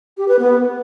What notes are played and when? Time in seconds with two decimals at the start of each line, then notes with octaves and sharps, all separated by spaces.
0.17 G4
0.28 B4
0.39 B3